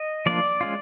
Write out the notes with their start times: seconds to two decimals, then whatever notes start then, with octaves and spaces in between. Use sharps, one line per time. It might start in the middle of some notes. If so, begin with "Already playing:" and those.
Already playing: D#5
0.26 F3 A#3 D4 F4 D5
0.61 G#3 C#4 F4